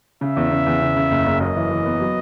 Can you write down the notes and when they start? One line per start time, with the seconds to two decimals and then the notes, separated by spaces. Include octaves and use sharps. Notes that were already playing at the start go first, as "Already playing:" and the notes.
0.21 C#3 E5
0.37 E2
0.51 C#3
0.67 E2
0.82 C#3
0.96 C#3
1.11 F#1
1.26 F#1
1.41 F#2 D#5
1.56 E3
1.71 E3
1.86 B3
2.01 F#3